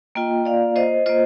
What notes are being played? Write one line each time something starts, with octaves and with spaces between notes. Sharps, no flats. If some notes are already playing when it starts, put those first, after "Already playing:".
A#3 F4 D#5 G5
D5 F5
C5 D#5
A#3 F4 C5 D#5